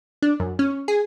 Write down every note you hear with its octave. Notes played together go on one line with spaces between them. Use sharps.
D4
F#2
C#4
G#4